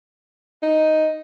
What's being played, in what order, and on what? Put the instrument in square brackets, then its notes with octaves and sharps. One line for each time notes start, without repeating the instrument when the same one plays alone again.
[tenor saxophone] D#4